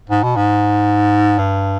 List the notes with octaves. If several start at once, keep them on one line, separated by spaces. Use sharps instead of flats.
G#2
B2
G#2
G2